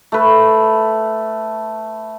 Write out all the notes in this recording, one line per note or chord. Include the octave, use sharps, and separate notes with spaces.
A3 B4